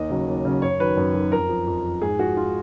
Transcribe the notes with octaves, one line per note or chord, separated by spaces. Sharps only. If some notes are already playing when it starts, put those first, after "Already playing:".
Already playing: D#2 D#5
C#3 F#3
D#2
C#3 F#3
F#2 C#5
D#3 F#3 B4
F#2
D#3 F#3
F2 A#4
F3
F2
F3
G#2 G#4
F3 F#4
F4